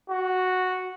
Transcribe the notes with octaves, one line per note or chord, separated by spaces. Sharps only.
F#4